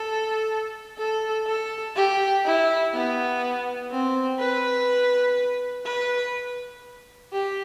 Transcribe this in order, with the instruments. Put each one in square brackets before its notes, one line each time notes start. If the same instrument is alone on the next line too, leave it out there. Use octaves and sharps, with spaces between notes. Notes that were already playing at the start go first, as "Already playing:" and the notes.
Already playing: [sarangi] A4
A4
A4
G4
E4
B3
C4
B4
B4
G4